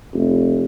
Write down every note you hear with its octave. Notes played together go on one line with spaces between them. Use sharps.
F1